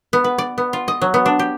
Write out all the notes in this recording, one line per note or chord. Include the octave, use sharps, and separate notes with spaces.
B3
B4
D5
B3
F4
D#5
F#3
B3
D4
G4